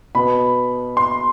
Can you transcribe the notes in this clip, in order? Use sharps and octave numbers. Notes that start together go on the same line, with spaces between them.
B2 B3 B5
C6